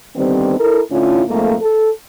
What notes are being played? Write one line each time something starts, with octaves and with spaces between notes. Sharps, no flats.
D3 D#3 G3 B3 C4
E4 A4 A#4
A2 D3 C#4 E4 F4
F2 G#2 A3 A#3
A4